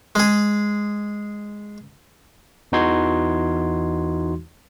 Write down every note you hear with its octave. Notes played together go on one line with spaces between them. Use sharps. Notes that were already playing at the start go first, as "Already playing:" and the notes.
G#3 G#4
E2 E3 D#4 F#4 C6 G#6